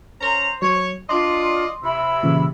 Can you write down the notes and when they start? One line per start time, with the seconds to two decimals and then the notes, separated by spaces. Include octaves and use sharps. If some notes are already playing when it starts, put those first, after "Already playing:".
0.21 C#4 C5 A#5
0.62 F#3 C#5
1.09 D4 F4 D5 D#5 C6
1.83 C3 E4 B5 E6
2.23 A#2 C#3 E3